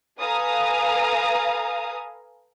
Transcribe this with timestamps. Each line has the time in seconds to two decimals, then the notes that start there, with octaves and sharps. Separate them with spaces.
0.20 A4 B4 F5 G#5 A#5 D#6